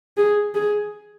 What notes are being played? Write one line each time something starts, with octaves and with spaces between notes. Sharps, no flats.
G#4
G#4